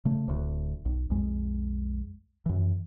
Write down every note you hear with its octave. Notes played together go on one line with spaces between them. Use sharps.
C#3 A3
D1 D2
B1
B1 F2 G#3
F#2 E3